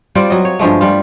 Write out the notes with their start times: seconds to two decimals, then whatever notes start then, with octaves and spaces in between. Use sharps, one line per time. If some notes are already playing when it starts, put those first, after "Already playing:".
0.15 G3 C4 F4 D5
0.30 F#3 D#5
0.45 C#5
0.59 G2 F3 G#3 A3
0.81 G3 F4